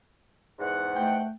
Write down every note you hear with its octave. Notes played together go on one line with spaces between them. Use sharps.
E2 G#2 F#5
A3 G5